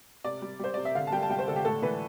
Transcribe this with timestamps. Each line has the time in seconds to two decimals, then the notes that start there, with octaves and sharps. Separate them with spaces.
0.24 C3 D5
0.42 G3
0.59 G3 C5
0.74 C3 D5
0.85 E5
0.95 D3 F5
1.07 A5
1.12 G3 G5
1.22 A5
1.29 G3 G5
1.39 C5
1.48 D3 A4
1.56 G4
1.65 A2 A4
1.82 E3 B4